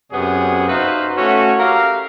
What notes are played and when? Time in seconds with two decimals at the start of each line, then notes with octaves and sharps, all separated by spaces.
0.12 F#2 C3 B3 G#4 C#5 F#5
0.68 D#4 F#4 B4 C5 E5 F5
1.18 A3 C#4 E4 F#4
1.59 G4 A#4 E5 F5